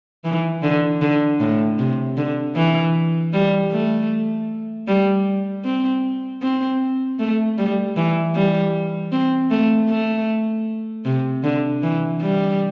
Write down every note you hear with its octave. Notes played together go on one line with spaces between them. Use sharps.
E3
D3
D3
A2
C3
D3
E3
G3
A3
G3
C4
C4
A3
G3
E3
G3
C4
A3
A3
C3
D3
E3
G3